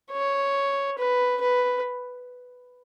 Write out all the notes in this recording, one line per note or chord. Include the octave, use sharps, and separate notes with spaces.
C#5
B4
B4